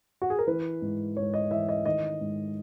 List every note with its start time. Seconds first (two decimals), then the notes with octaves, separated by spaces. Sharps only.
0.22 F#4
0.30 G#4
0.39 A#4
0.47 E3 B4
0.82 G#2
1.17 G#2 C#5
1.34 D#5
1.51 E3 E5
1.69 D#5
1.86 D#3 D#5
2.21 G#2